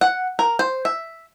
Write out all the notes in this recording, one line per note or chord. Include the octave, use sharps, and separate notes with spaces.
F#5
A#4
C5
E5